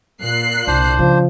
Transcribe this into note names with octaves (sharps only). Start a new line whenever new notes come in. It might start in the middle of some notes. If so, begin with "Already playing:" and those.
A#2 F#6 C7
C2 D4 C5
C#3 F3